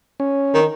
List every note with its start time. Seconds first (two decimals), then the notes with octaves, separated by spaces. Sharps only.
0.20 C#4
0.54 D#3